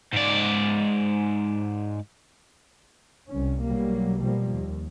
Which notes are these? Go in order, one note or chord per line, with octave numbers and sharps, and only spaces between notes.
G#2 D5
C2 C#4
B1 F#3 G3 A#3
B2 F3 G3 A#3
D#2